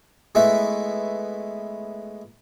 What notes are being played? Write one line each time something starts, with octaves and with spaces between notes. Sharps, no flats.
G#3 A3 B3 E4 B4 E5